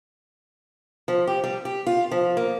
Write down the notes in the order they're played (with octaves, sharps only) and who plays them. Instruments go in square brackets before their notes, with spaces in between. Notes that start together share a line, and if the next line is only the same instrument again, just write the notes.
[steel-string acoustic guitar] F3
G4
G3
G4
F4
F3
A#3